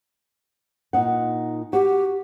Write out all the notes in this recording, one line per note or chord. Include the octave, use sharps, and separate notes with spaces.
A#2 D#4 F#5
F#4 G4